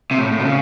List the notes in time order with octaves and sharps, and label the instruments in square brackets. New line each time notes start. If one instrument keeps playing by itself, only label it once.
[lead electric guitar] C3
A2
A2
C3
C#3